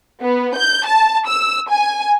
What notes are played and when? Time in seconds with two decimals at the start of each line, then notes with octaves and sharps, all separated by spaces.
0.22 B3
0.57 G6
0.88 A5
1.28 E6
1.70 G#5